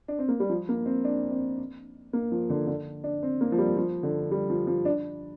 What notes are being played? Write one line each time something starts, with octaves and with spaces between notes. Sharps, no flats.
D4
C4
A#3
G3
F3
A#3
C4
D4
C4
A#3
F3
D3
D3
D4
C4
A#3
F3
G3
F3
D3
G3
F3
F3
D4